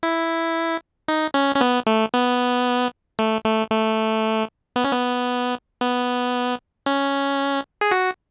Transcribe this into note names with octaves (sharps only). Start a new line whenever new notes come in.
E4
D#4
C#4
C#4
B3
A3
B3
A3
A3
A3
B3
C#4
B3
B3
C#4
G#4
F#4